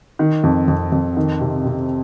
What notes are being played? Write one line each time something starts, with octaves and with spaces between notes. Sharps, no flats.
D#3
F2
F2
F2
D#3
C3
C3